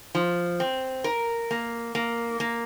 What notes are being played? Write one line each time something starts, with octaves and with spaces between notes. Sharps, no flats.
F3
C4
A#4
A#3
A#3
A#3